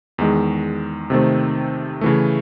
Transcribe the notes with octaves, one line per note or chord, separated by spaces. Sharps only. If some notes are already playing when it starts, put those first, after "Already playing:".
E2 D#3 G#3
C3 D#3 A3 C4
C#3 E3 A3